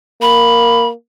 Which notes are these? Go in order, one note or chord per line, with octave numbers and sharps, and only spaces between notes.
A#3 B5